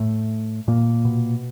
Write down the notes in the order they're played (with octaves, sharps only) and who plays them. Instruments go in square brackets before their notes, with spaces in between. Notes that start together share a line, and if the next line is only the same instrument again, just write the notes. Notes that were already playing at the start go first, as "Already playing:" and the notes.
Already playing: [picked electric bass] A2 A3
A#2 A#3
B2